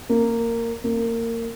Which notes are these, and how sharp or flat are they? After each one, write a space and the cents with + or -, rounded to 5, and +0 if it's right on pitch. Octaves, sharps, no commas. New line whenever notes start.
A#3 -15
A#3 -25